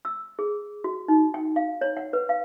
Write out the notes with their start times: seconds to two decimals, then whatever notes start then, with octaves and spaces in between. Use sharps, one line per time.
0.05 E6
0.39 G#4
0.84 F#4
1.08 D#4
1.34 G5
1.56 F5
1.81 C#5
1.97 F#5
2.13 B4
2.29 F5